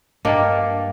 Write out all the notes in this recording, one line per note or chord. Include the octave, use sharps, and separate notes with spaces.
G2 A#3 D4 D#5 G5